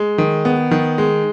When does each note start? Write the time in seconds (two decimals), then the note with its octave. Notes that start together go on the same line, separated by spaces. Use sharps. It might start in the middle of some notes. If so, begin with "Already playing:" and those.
Already playing: G#3
0.18 D#3
0.45 B3
0.71 D#3
0.98 G#3